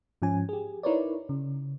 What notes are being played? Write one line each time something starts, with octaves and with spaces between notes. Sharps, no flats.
G#2 F3 C#4 G#5
G4 G#4
D#4 E4 A#4 B4 C#5 D5
C#3